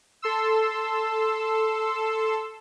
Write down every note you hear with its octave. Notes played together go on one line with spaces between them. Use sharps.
A4 C6 E6